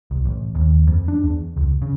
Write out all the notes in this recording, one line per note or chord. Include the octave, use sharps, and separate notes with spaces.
C2
A1
D#2
F2
D4
E2
C#2
C#3